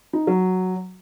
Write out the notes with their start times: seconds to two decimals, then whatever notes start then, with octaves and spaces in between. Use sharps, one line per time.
0.13 D#4
0.27 F#3